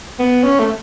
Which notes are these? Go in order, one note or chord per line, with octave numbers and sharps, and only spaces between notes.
B3
C#4
A3